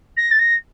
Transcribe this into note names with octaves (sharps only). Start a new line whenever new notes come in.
A#6
A6
A#6